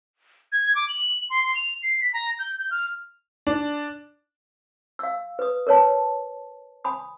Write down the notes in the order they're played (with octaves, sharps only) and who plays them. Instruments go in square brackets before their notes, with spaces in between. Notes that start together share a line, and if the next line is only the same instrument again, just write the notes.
[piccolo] G#6
D6
F#7
C6
C6
F7
C7
B6
A#5
G6
G6
F6
[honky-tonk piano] D4
[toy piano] F5 E6
B4 D#6
A#4 B4 C#5 A5
G#5 B5 D#6